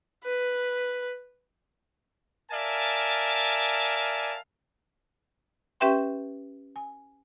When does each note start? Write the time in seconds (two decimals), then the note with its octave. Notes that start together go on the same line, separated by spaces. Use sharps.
0.24 B4
2.51 A#4 D5 E5 F5 G#5 A5
5.80 C#4 G4 B4 E5 G5 C6
6.76 G#5